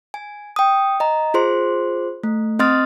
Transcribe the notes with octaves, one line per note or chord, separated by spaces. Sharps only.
G#5
G5 D#6
D#5 A#5
F4 G#4 C5 C6
A3
C4 D#5 C6 D#6 F6 A6